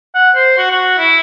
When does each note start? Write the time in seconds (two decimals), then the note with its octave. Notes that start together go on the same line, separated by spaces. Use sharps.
0.15 F#5
0.35 C5
0.58 F#4
0.71 F#4
0.98 E4